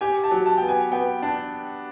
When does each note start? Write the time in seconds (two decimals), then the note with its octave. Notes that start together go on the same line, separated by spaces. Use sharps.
0.01 G4 G#5
0.24 A5
0.31 F#3
0.46 A5
0.58 B3 G5
0.68 G#5
0.92 B3 G5
1.22 D4